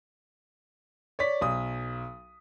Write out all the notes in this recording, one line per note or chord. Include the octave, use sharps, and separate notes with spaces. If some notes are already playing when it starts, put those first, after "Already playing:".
C#5 D5 B6
B1 D#6